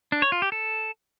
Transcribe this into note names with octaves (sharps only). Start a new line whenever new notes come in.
D4
C#5
F4
G4
A4